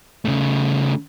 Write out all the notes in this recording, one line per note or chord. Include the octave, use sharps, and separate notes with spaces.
C#3 A3